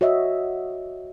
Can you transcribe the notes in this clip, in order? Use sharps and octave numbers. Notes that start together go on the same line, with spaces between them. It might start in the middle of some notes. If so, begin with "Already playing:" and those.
F#4 C#5 D#5 E5